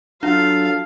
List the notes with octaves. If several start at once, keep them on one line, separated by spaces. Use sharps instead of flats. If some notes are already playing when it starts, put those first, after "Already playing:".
F#3 D4 F4 A4 F5